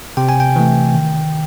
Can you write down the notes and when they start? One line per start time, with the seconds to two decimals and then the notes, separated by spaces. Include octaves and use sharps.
0.17 C3 G5
0.29 G#5
0.40 G5
0.56 E3 A3
0.95 D#3